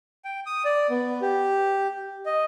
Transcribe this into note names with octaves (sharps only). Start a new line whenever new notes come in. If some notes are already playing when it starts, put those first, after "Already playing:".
G5
D#6
D5
B3
G4
D#5